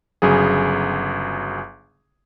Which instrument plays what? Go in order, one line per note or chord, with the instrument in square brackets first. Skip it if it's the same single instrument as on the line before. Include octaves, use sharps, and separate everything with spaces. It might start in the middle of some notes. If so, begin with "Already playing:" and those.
[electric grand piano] G1 C#3 F#3 G#4